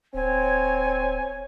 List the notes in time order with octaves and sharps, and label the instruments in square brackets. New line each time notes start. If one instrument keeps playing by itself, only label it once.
[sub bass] D1 [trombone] C4 [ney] C#5 [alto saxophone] G#5